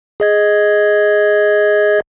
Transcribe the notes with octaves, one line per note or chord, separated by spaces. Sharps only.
G#4 D#5 G#6